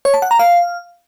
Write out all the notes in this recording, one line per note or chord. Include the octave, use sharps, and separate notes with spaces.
C#5
A5
F#5
A#5
F5